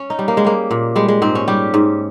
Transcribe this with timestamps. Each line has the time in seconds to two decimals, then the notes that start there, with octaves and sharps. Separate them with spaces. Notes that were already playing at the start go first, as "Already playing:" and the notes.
Already playing: C#4
0.10 D#4
0.19 G3
0.28 A#3
0.37 G#3
0.44 G3 A#3
0.71 A#2
0.96 G3 G#3
1.08 G#3
1.22 G#2 C4
1.35 C#4
1.48 G3 G4
1.74 G#2